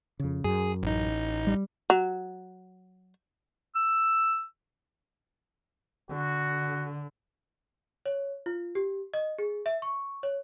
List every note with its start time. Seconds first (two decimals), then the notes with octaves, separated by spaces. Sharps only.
0.20 F2 C#3
0.44 F#2 G#4
0.83 A1 D#4
1.47 G3
1.90 F#3
3.75 E6
6.10 D3 F#4
8.06 C#5
8.46 F4
8.75 G4
9.14 D#5
9.39 G#4
9.66 E5
9.82 C#6
10.23 C#5